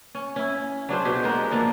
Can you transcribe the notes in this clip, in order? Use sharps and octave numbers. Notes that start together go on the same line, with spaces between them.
C#4
C#4 E4
F#3 D4 G#4 C5
B2 G4 G#4
G#3 B3 A#4 C5
A#2 F3 A#3 D4